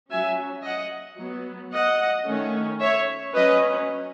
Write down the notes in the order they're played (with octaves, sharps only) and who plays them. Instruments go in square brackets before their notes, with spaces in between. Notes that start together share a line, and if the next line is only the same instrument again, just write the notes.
[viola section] F#3 C#4 E5 G#5
D#5 F#5
F#3 B3
D#5 F#5
D#3 A3 C#4
C#5 E5
F#3 C#4 B4 D#5